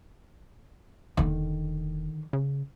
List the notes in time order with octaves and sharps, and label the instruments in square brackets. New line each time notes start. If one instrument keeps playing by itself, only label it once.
[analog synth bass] E1 [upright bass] D3 D#3
[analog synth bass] C#3